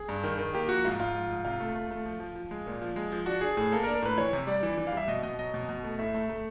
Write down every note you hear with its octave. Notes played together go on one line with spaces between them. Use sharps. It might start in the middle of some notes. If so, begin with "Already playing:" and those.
Already playing: G#4
G2
D#3
D#3
A#3 G4
F3 F#4
G#2 F4
G#2 F4
F3
G#2
C3 F4
A3
A3
A3
F3
F3
F3
G#3
A#2
F3
G#3
F3
D4 F#4
D4 G#4
A2 G#4
A#3 A4
A#4
D4
A#4
A2 B4
E3 C#5
C3
G3 D5
E3
E3
F5
G3 E5
B2 D#5
B2 D#5
F#3 D#5
B2
B2
A3
A2 E5
A3
A3